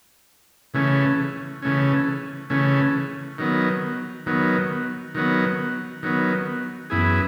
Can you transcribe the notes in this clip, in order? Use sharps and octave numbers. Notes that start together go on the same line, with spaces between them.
C#3 E3 A3 C#4
C#3 E3 A3 C#4
C#3 E3 A3 C#4
D#3 F#3 B3
D#3 F#3 B3
D#3 F#3 B3
D#3 F#3 B3
F#2 E3 B3 E4 G#4